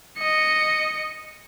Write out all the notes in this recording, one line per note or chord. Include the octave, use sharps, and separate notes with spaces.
D#5 C#7